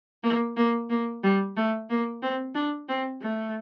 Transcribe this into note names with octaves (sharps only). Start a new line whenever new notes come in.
A#3
A#3
A#3
G3
A3
A#3
C4
D4
C4
A3